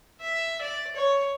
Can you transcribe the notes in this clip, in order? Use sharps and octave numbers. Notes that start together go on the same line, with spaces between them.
E5
D5
C#5